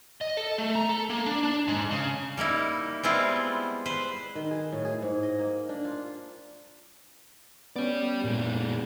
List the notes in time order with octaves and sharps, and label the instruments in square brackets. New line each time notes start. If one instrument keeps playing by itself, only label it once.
[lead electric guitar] D#5
A4
A3
A#5
A4
A#3
D4
D4
G#2
C#3
[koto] G3 A#3 D#4 E4
G3 G#3 B3 C4 E4 F4
B4 C5
[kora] D#3
G#4
A2
G#4
G#2
D#5
A#3
D4
F4
[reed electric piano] B3 C#4 [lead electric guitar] G4 D5
[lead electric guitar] A#2 G#3